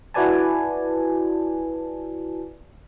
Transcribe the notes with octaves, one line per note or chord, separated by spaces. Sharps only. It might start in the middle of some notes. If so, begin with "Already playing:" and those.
E4 F#4 B4 D5 G#5 A5